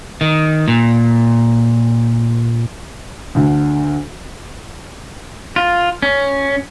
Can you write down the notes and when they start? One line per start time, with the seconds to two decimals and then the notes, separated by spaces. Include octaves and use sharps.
0.21 D#3
0.68 A#2
3.35 D2 D3
5.56 F4
6.02 C#4